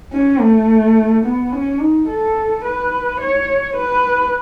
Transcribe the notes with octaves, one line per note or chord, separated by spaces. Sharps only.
C#4
A3
B3
C#4
D#4
A4
B4
C#5
B4